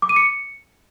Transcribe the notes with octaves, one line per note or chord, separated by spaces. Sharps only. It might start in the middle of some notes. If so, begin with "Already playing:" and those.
D6
D#7
C#7